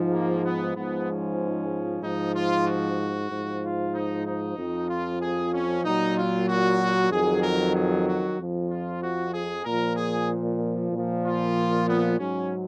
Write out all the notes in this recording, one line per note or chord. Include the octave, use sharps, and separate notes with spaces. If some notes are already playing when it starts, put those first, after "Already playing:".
Already playing: G#2 F3
A#3
B3
G#2 F3 B3
C#4
G#2 F3 D#4
F4
F#4
G#2 F3
F4
D#4
D#4
F2 F3
F4
G#4
C#4
A#2 F#3 D#4
F4
F#4
F2 D#3 F#3 G#4
A#4
G#4
F#4
F2 F3
F4
F#4
G#4
A#2 F3 A#4
G#4
A#2
F3
F4
B3
G#2 F#3 C#4